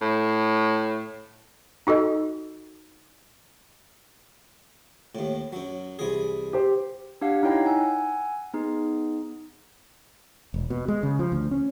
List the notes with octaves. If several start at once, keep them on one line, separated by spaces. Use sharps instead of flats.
A2
D#4 F#4 A4 D#5
D#2 A2
F#2 F#3
C2 E3 G#4
G4 C5
D4 G4 F5 F#5
D#4 E4 C#5 G5 A#5
F#5 G#5 E6
B3 D#4 G#4
E1
B2
G#3
C#3
F3
D2
C#4